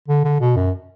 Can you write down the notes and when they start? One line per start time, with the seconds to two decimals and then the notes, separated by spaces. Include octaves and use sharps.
0.08 D3
0.24 D3
0.41 B2
0.56 F#2